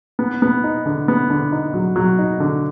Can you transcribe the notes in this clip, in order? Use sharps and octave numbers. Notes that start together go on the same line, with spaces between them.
B3
B3
D#4
D3
B3
D3
D#4
F#3
F#3
D#4
D3